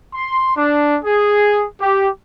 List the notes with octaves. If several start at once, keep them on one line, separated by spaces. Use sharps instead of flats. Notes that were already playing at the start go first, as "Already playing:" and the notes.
C6
D4
G#4
G4